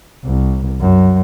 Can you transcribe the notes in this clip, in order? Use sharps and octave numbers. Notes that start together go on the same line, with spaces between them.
C2
F#2